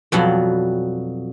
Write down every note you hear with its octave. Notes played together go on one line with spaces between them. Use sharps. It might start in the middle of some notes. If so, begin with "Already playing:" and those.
F2 B2 F#3 G3